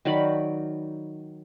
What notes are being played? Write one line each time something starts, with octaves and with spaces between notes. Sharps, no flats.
D#3 F#3 D5 B5